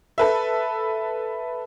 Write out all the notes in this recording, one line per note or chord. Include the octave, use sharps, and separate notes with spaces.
A4 B4 E5